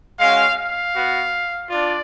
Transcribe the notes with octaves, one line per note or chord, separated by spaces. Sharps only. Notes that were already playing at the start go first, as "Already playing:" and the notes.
G#3 C#4 F#4 F5
F5
B3 F#4
D4 F4 D5